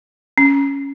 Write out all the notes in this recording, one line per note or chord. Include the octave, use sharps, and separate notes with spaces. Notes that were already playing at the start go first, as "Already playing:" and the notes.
C#4